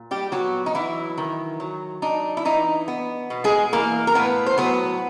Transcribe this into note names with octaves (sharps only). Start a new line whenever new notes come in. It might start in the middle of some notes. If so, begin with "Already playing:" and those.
Already playing: A#2
G3 G4
F#3 B3 F#4
D#4
E3 F#3 E4
D#3
F#3
D4 D#4
E4
E3 D#4
B3
B2
G#3 G#4
E3 A#3 A#4
A#4
A2 B3 B4
C5
F#3 B3 B4